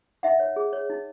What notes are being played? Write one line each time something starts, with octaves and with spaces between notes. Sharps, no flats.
D#4 E5 F#5
C#5
G#4
C#5
D#4